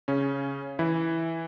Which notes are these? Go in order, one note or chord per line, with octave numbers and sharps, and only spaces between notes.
C#3 C#4
E3 E4